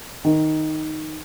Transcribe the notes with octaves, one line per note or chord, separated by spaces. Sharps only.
D#3